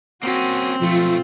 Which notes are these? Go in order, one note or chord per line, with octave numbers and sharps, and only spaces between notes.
A#3 C4 C#4 F#4
B1 F3 A3 F4